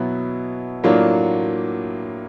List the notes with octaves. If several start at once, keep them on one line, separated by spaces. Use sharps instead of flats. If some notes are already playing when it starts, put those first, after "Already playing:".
Already playing: B2 F#3 B3 E4
A2 F#3 A#3 D4 F4